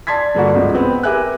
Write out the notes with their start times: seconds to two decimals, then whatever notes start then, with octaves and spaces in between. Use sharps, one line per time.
0.07 D5 A5 C6 G#6 B6
0.35 G2 D3 A#3 F#4
0.55 C#2 G#2 F3
0.75 B3 C4
1.03 G4 A#4 B4 E5 G#5 F#6